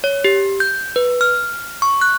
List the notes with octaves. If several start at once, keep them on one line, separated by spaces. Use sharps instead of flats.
C#5
G4
G6
B4
F6
C#6
F#6